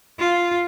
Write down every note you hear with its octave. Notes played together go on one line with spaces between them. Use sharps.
F4